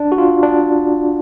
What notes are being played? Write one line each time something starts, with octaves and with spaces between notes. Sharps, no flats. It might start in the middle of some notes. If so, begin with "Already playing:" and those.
Already playing: D4
F#4
F4
D4